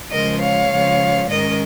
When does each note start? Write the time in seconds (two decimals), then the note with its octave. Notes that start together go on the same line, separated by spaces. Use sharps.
0.12 C#3 F3 G#3 A#4 D#5
0.41 C#5 F5
0.71 C#3 F3 G#3
1.29 G#2 D#3 G#3 C#4 A#4 D#5